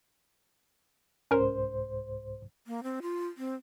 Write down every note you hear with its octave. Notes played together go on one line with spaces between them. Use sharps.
C2 G#2 C#4 A#4 C5
A#3
C4
F4
C4